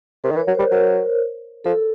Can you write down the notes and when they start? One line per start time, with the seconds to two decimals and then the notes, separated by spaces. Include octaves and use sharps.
0.24 C3 A#4
0.31 D#3
0.36 E3
0.40 C#5
0.47 F#3
0.55 C5
0.59 G3
0.71 F#3 A#4
1.64 F3 A4